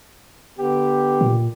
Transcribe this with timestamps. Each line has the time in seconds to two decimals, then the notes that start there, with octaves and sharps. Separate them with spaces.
0.59 D3 B3 G4
1.21 A#2